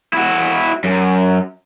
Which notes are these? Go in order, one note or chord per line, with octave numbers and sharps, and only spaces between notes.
E4 F#4
F#2